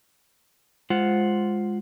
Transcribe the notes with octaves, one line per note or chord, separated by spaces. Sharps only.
G#3 F4 C5 F#5